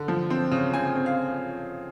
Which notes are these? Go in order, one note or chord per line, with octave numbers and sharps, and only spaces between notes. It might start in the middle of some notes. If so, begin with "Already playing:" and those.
Already playing: D3
F3
C4
C#3
C4 G#5
C4
F5